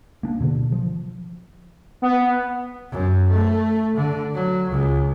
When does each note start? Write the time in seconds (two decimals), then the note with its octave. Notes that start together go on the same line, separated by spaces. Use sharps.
0.23 A#3 D4
0.40 B2 D3
0.72 F3
2.02 B3
2.92 F#2
3.29 A3
3.96 D3
4.34 F#3
4.70 C#2